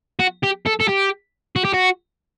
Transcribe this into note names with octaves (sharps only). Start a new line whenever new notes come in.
F#4
G4
A4
A4
G4
F#4
G4
F#4